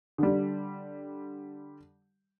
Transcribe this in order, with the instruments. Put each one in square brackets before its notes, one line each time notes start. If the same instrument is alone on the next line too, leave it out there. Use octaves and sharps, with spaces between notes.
[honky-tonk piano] D3 G3